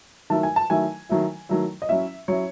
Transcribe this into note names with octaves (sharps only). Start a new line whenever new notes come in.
D#3 F#3 A3 E4 A5
G#5
A5
D#3 F#3 A3 E4 G#5
D#3 F#3 A3 E4
D#3 F#3 A3 E4
D#5
F#3 C#4 E4 E5
F#3 C#4 E4 C#5